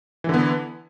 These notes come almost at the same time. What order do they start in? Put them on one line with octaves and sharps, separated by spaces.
E3 D3 B3